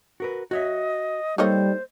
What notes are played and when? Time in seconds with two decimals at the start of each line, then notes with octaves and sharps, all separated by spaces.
0.20 F#4 A#4 B4
0.51 F#4 C#5 D#5 E5
1.38 G3 A#3 D#4 A4 C5 C#5 D#5